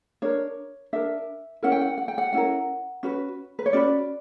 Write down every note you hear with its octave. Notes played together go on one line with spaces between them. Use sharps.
D4 A#4 C#5
D4 A#4 E5
C#4 E4 A#4 F#5
G5
F#5
F#5
G5
F#5
C#4 E4 A#4 F#5
C#4 F#4 B4
B4
C#5
C#4 F#4 B4 D5